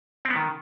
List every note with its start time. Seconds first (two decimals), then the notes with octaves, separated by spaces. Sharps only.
0.25 C4
0.30 B3
0.36 D#3